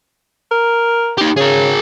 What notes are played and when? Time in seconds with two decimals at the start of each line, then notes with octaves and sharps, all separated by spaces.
0.51 A#4
1.18 D#4 G4
1.37 C#3 G#4 A#4